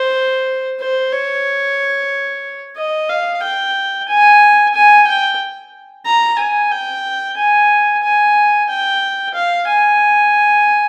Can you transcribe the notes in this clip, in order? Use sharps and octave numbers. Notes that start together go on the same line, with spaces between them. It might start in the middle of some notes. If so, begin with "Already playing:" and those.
Already playing: C5
C5
C#5
D#5
F5
G5
G#5
G#5
G5
A#5
G#5
G5
G#5
G#5
G5
F5
G#5